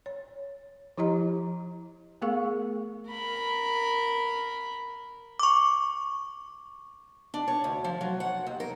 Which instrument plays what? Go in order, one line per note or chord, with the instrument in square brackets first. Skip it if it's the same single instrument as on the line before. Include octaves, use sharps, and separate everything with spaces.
[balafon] C#5
F3 E4 G4 D#5 A#5
A3 B3 G#4 A#4 F5 C#6
[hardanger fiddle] A#4 B5
[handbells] C#6 D6
[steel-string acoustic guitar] D4
C#5
D2
F3
F#3
F#5
D#2
A#4